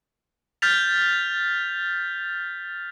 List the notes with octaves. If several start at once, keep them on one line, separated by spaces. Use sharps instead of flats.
F6 G6 A6 B6 F7